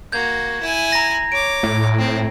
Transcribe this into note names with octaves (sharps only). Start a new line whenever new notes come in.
A#3 F#4 G6 G#6
E4 G#5
A#5 A#6
C#5 D6 D7
A2
C4